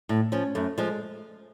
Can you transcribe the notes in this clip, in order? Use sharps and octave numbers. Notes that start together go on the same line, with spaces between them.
A2
F3 C#4
F#2 A3
F3 G#3